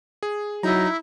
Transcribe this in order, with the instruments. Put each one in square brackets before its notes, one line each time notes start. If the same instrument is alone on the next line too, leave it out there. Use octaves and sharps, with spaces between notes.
[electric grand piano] G#4
[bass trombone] F#3 [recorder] D#4 [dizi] E4 [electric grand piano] A#5